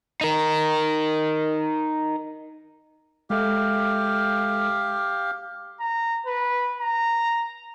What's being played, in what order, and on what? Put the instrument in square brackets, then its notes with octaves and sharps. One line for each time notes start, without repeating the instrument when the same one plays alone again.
[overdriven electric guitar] D#4 A#4
[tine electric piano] G#3 A4 E5 [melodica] G4 F5
[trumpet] A#5
B4
A#5